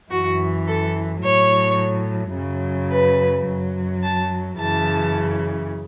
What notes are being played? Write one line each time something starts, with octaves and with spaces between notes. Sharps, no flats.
F#2 E3 F#4
A4
A2 F#3 C#5
F#2 C#3 F#3
B4
F#2 F#3
A5
F#2 C#3 E3 A5